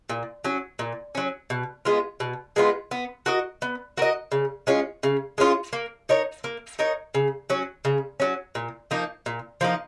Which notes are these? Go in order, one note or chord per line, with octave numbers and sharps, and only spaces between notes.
A#2
F#3 C#4
A#2
F#3 C#4
B2
G#3 B3 F4
B2
G#3 B3 F4
B3
F#4 A#4 D#5
B3
F#4 A#4 D#5
C#3
G#3 C#4 F4
C#3
G#3 C#4 F4
A#3
D#4 A#4 C#5
A#3
D#4 A#4 C#5
C#3
F#3 C#4
C#3
F#3 C#4
A#2
F3 A#3 D#4
A#2
F3 A#3 D#4